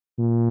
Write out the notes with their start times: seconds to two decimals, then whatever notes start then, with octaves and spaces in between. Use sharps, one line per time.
0.19 A#2